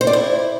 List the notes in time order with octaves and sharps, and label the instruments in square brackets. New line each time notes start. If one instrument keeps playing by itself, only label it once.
[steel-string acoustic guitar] C5
D5
E4